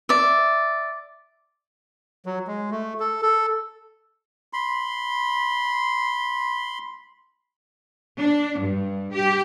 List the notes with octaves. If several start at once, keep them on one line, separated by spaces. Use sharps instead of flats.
D5 E5
F#3
G#3
A3
A4
A4
B5 C6
D4
G2
G4